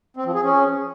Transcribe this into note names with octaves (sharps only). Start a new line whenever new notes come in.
C4
F3
G#4
C#4